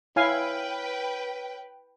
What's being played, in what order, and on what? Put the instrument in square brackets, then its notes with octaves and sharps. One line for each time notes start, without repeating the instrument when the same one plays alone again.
[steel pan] E4 F5 G#5 [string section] B4 G5 [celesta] C#5 F6